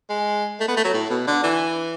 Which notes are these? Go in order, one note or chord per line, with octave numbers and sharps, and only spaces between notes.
G#3
A3
B3
A3
F#3
A2
B2
D3
E3